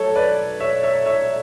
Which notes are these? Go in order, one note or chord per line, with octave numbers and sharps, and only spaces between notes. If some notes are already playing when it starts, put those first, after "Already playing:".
Already playing: F#3 A3 A4 C#5
B4 D5
C#5 E5
C#5 E5
C#5 E5